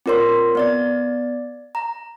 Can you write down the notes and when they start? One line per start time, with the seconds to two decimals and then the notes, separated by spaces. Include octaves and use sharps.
0.06 C4 F4 A#4 C#5 C6
0.55 B3 D5 A6
1.75 A#5